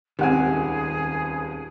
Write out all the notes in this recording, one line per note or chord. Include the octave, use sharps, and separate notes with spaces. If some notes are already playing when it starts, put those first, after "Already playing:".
D#1 C#2 D#3 C4 G4 G#4 F#5 G#5